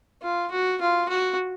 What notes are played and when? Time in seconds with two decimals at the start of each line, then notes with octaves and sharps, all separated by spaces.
0.22 F4
0.51 F#4
0.81 F4
1.09 F#4